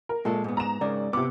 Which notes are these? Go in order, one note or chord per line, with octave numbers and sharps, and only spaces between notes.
A#4
A#2 G#3 A4
G#2 B3
A#5 E7
G#2 C#3 A#4 D5
C3 B3 D6